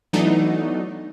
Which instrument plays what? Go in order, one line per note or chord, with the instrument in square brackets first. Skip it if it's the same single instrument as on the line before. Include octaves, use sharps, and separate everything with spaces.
[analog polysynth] E3 F#3 A3 B3 D4 D#4